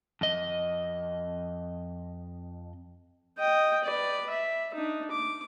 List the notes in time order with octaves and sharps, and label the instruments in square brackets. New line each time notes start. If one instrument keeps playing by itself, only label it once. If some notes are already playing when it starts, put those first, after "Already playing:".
[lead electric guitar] F2 D#5
[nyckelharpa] D#5 G5
B4 D5
E5
D4 D#4
D6